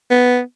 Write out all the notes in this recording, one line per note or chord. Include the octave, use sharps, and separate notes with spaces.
B3